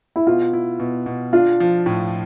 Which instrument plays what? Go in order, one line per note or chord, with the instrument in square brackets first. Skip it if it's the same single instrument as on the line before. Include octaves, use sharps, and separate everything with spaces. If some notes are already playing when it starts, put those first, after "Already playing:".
[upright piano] E4
[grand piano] B2 [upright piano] F4
[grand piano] E4
B2
B2
[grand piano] D4 [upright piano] F4
[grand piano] F3
A2